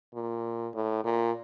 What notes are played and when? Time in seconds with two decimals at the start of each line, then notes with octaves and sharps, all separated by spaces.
0.14 A#2
0.74 A2
1.04 A#2